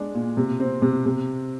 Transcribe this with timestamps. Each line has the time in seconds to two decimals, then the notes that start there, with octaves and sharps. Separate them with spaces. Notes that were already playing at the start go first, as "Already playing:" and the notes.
Already playing: G#3 D4
0.15 A#2
0.37 C3
0.60 C4
0.82 C3
1.06 C3